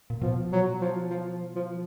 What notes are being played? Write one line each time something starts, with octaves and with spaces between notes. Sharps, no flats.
A#2
B2 F3
F#3
F3
F3
F3